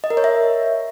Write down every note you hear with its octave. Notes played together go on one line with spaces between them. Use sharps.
D#5
A#4
C#5
E5